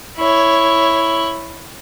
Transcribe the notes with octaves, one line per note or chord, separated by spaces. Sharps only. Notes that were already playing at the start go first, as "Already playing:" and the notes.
E4 C#5